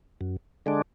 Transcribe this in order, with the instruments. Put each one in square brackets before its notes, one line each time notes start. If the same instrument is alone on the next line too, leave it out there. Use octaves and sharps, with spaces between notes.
[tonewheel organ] F#2
D3 G#3 D4